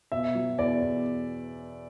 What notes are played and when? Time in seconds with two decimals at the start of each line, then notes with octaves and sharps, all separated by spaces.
0.12 B2 E5
0.35 F#3
0.58 E2 D5
0.82 E2